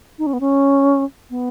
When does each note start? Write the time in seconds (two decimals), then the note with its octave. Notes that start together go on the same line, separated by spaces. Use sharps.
0.19 D#4
0.26 C#4
0.33 B3
0.40 C#4
1.30 B3